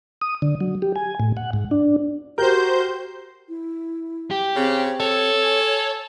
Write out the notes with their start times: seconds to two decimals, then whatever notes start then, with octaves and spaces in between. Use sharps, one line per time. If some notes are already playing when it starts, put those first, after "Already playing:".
0.21 D#6
0.42 D3
0.61 F#3
0.82 G4
0.96 G#5
1.20 A2
1.37 F#5
1.53 G#2
1.71 D4
2.38 F#4 G4 A#4 C5 G6
3.49 E4
4.31 G4
4.56 C#3 C4
5.00 A4 C#5
5.44 G#5